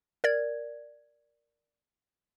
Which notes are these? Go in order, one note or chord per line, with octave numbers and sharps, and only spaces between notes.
A#4 D5 G#6